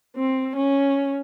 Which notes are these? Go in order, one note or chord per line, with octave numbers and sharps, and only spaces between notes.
C4
C#4